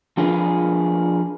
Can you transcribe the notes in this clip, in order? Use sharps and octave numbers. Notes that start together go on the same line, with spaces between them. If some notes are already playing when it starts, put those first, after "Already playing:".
F3 D4 F4 G#4 A#4 B4